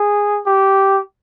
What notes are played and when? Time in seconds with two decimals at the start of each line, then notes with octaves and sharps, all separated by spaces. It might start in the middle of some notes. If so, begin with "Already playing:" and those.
Already playing: G#4
0.46 G4